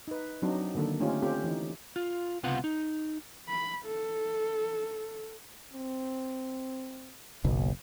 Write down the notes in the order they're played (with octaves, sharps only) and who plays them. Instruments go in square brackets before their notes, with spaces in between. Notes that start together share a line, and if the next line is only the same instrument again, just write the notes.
[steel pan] D#4 B4
F#3 C4 D4 D#4
D3 D#3 A#3 D4 A4
A3 C4 C#4 D#4 F4 G4
C4 C#4 F4 G4 A4
E3 D#4
[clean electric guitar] F4
C#2 C3 B3 F4 F#5
D#4
[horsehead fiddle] B5
A4
[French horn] C4
[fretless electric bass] F#1 B1